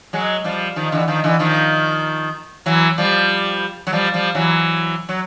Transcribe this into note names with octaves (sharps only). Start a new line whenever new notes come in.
F#3 G#3
F3 G3
D#3 F3
D3 E3
D#3 F3
D3 E3
D#3 F3
E3 F#3
F3 G3
F#3
F3 G3
F3 G3
E3 F#3
F#3